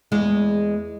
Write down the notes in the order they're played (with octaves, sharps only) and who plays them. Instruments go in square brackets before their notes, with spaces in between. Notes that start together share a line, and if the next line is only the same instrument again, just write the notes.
[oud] E2 G#3